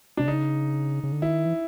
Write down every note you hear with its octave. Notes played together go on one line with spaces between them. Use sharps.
C3 D4
C#3 D#4
C#3
D3
D#3 E4
E3